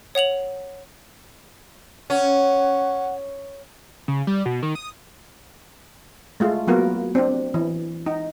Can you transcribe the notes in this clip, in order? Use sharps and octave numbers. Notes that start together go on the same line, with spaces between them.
C#5 F#5 F7 F#7
C#4 F#5
C#3
G3
B2
D#3
D#6
G#3 A3 F4
F#3 A#3 B3 F4 F#4 A#4
C4 D4
E3
D#4